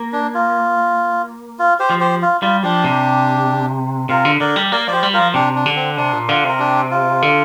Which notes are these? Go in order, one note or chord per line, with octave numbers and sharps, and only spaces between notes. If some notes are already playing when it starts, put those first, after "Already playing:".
Already playing: A#3
D4
F4
F4
G4 C5
F3
G4 C5
F4
G3 F4
F3 D4 G4
C3
C3 F4 A#4
D3
D3 A#4 D5
G3
A#3 A#4 D5
F3 G4 C5 D5
G3
F4 A#4
F3
C3 D4 G4
D4
D3
C4
C3 D4
A#2
D3 F4
C3 A#4
D4 G4
F4
D3